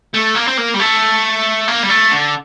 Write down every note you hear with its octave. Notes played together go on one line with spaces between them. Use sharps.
A3
A#3
C4
A#3
G3
A3
A#3
G3
A3
D3